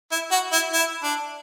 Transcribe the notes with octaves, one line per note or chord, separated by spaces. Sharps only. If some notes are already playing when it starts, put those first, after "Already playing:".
E4
F#4
E4
E4
D4